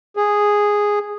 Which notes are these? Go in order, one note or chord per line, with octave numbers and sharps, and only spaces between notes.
G#4